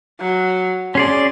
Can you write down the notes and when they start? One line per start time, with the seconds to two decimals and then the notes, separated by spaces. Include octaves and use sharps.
0.19 F#3
0.95 C#4 G#4 D5 C6